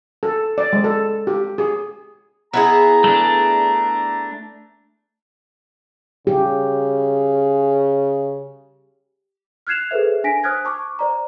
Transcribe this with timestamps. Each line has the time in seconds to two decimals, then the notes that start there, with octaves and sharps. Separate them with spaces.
0.23 A4
0.58 D5
0.73 G#3
0.84 A4
1.27 G4
1.58 G#4
2.53 B3 E4 G#4 A#5
3.04 A3 D4
6.27 C#3 G4
9.67 F6 F#6 G#6 C7 E7 F7
9.91 G#4 A4 B4 C5 E5
10.24 D4 G#5 A#6 B6 D7
10.44 C5 D#6 F6 F#6 G#6
10.65 A5 C#6 D6
10.99 C5 D5 A#5